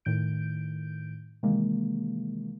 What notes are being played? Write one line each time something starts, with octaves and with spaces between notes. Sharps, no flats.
A2 D#3 G6 D7
C3 D#3 E3 G#3 A#3